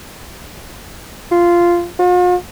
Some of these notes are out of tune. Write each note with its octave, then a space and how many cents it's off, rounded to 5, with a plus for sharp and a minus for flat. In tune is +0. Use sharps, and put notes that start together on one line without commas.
F4 -10
F4 +45